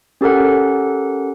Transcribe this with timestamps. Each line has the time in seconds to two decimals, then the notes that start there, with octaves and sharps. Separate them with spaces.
0.21 C#4 G4 A4 A#4 F#5